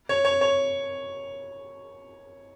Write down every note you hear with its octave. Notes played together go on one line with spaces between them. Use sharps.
C#5
C#5
C#5